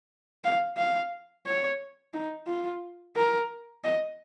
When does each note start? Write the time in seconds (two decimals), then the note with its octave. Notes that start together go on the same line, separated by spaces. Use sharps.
0.44 F5
0.77 F5
1.46 C#5
2.14 D#4
2.47 F4
3.16 A#4
3.84 D#5